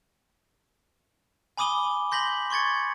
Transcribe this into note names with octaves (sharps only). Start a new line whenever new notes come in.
G#5 B5 D6 D#6 D#7 G7
C6 G6 A#6 B6 F#7
C6 C#6 G#6 A6 C#7